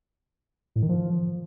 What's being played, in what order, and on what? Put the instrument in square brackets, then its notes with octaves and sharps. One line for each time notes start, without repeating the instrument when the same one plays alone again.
[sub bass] A2
D#3
F3